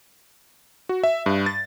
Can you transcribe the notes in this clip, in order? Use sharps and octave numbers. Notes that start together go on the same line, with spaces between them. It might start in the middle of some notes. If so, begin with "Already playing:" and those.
F#4
E5
G2
A6